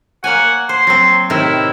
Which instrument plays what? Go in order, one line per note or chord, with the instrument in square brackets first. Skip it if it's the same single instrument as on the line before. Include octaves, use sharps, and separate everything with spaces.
[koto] A#3 C#5 G#5 [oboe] F#5
[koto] C5 [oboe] C6
[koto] F#3 C4
[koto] A2 C3 D#3 [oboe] E4